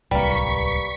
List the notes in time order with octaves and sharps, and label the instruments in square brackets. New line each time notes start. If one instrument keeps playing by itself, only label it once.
[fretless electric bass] D1 C2 [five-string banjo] G3 A#3 [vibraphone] B4 D5 [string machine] C#6 B6